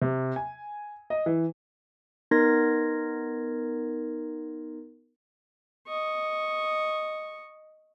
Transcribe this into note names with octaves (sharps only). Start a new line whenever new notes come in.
C3
G#5
D#5
E3
B3 D#4 A#4 C6 G#6 A#6
D#5 C#6